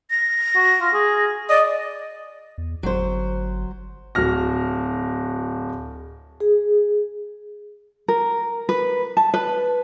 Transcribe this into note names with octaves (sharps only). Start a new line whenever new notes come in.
A#6
F#4
F4
G#4
D5 D#5
E2
G1 F#3 C5
D1 F#4 F6 A#6
G#4
A#4
B4
A5
B4